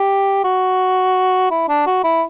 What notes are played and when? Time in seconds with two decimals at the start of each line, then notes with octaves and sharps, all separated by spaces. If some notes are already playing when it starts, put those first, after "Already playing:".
Already playing: G4
0.44 F#4
1.51 E4
1.69 D4
1.86 F#4
2.04 E4